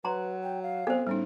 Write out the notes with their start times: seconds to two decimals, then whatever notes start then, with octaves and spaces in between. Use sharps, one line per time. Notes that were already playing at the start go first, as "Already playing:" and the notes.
0.05 F#3 B4 A#5 C6
0.44 G5
0.63 F5
0.87 B3 C4 A4 C5
1.07 A2 G3 C#4 D#4